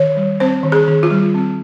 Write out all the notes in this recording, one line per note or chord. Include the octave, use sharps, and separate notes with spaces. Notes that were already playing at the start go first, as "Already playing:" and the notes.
Already playing: D#3 C#5
G3
C4 C5
D#3
G#4
D#3
F4
G3
C4